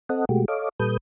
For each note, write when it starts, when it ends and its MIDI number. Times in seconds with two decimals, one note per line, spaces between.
0.09 0.25 60
0.09 0.25 69
0.09 0.25 75
0.09 0.25 78
0.29 0.45 47
0.29 0.45 56
0.29 0.45 57
0.29 0.45 66
0.29 0.45 67
0.48 0.69 69
0.48 0.69 73
0.48 0.69 75
0.48 0.69 77
0.48 0.69 86
0.80 0.97 46
0.80 0.97 55
0.80 0.97 69
0.80 0.97 71
0.80 0.97 87
0.80 0.97 91